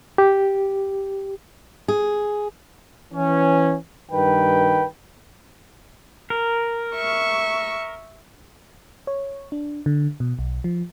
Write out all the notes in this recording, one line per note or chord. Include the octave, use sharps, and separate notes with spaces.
G4
G#4
E3 C#4
G2 D#3 B4 G5
A#4
E5 C#6
C#5
D4
D3
B2
B1
F3